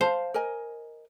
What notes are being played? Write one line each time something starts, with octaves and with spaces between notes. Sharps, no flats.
C5 F5 A5
A#4 D#5 G#5